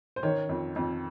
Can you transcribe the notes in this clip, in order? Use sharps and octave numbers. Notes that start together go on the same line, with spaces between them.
C5
D#3 C#5
F2
F2